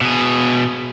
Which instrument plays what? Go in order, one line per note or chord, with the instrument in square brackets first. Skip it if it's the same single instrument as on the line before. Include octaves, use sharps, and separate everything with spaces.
[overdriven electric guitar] B2 G#4